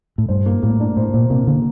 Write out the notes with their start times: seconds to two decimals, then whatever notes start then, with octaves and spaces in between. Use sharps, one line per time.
0.18 A2
0.29 G2 C5
0.46 A#3
0.62 A2 A#3
0.80 D4
0.97 A2 C5
1.14 A#2 C5
1.30 C3 A#3
1.47 D3 A#3